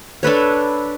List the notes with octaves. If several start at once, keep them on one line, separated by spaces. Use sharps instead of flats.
D4 A4 B4 C#5